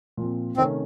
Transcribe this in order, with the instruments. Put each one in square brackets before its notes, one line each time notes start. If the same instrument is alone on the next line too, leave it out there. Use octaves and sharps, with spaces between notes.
[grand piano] A#2 F3 C4
[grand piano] C3 D#3 A3 C#4 [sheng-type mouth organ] C4